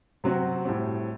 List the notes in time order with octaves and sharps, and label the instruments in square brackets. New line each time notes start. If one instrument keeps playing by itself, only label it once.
[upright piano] C3 F#3 C4 F#4
A2 G3 C4